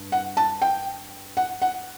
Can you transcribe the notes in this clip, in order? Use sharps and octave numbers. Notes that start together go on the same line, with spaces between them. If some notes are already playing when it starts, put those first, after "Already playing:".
Already playing: G2
F#5
A5
G5
F#5
F#5